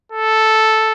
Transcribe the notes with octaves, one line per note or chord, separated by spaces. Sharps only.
A4